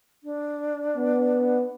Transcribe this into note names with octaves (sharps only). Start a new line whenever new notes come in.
D4
B3